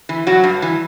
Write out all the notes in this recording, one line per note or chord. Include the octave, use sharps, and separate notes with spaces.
E3
G2 F#3 F#4
G2
E3